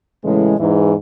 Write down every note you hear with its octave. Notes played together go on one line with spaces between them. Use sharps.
A2 C#3 E3 G#3
E2 G#2 E3